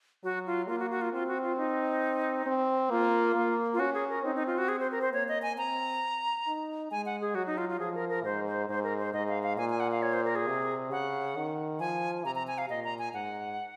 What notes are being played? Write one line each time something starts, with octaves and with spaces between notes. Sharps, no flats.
F#3 F#4
F4
A#3 F4
F#4
F#4
F4
C4 F4
F#4
F4
D#4
C4
A#3 F4
A#3
F4
C#4 F#4
G#4
A#4
C4 D#4
D#4
F4
F#4
G#4
C5
A#4
C5
A#3 C#5
D#5
G#5
C4 A#5
D#4
G#3 G#5
F#5
G#4
F#3 F#4
D#4
F4
F4
F3 G#4
A#4
A#4
G#2 C5
C5
G#2 C5
A#4
C5
G#2 D#5
F5
F5
A#2 G#5
G#5
F#5
F5
C#5
C5
A#4
G#4
C3
C#3 F#5
D#3
F3 G#5
C3 A#5
A#5
G#5
F5
A#2 D#5
A#5
G#5
G#2 F#5